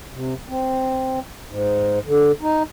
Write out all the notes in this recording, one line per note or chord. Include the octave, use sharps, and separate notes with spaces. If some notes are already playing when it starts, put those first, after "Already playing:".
C3
C4
G#2
D3
D#4